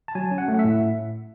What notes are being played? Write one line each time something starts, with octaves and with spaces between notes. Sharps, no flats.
A5
F#3 G#5
C#4
F#5
A3
F#5
E5
A2